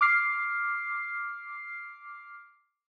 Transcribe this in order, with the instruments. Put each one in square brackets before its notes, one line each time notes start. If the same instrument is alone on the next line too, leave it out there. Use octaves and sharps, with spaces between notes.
[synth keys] D6 F6 C7